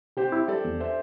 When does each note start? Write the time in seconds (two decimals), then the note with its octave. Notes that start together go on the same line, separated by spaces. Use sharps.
0.17 C3 G4 C5
0.32 E4
0.48 G3 A4 D5
0.64 E2
0.80 C5 E5